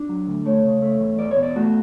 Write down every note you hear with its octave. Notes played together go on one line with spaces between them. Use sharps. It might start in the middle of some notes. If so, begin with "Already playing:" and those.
Already playing: D4
F#3
D2
A3 C#5
C#3
A3
E2
E2 D5
C#5
B2
D5
A3 F#4